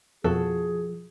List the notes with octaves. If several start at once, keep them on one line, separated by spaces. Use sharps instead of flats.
F2 B2 F3 F#4 G#4 A4